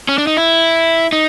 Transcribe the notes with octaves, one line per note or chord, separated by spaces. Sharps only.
C#4
D4
D#4
E4
D#4